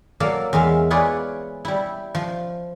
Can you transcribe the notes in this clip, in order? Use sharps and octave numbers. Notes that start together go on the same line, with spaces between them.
F#3 A#3 A4 D5 F5
E2 G#3 E5 F5
E4 F4 G#4 B4 C#5 D5
G3 E4
F3